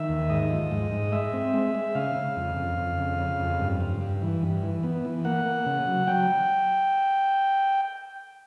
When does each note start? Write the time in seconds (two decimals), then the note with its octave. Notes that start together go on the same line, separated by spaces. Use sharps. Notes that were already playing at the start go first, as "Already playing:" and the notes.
Already playing: D#3 E5
0.09 D#2
0.30 G#2 D#5
0.50 F3
0.71 G#2
0.91 G#2
1.12 G#3 E5
1.33 C4
1.54 G#3
1.75 G#3
1.95 C#3 F5
2.16 C#3
2.36 F2
2.57 F2
2.78 F2
2.98 C#3
3.19 C#3
3.39 F2
3.60 G2
3.81 G2
4.01 G2
4.22 E3
4.43 G2
4.63 E3
4.83 B3
5.05 E3
5.25 A#3 F#5
5.46 A#3
5.66 C#3
5.87 F#3
6.07 F#3 G5